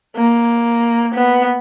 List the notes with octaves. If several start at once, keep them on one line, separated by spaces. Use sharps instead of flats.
A#3
B3